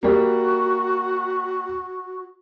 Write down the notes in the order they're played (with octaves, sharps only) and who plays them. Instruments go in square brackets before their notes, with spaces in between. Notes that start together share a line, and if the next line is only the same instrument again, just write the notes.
[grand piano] G3 A#3 [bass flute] F#4